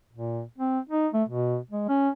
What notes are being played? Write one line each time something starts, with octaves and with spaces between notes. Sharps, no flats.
A#2
C4
D#4
A3
B2
G#3
C#4